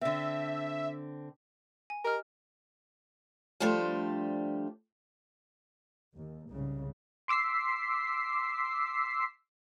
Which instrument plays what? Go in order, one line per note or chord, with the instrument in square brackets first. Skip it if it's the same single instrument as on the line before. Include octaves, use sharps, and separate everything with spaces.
[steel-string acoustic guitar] D3 C4 [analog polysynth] E5
[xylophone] G#5
[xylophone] G4 D#5 F6 [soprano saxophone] A#4
[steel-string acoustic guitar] F3 G3 A3 D4 G4 C5
[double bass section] D#2
C2 G#2 C#3
[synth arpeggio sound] C6 D6 E6 B6 C7